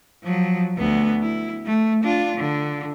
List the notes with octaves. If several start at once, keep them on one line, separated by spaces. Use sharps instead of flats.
F3 F#3
D2 B3
E4
A3
D4 F4
D3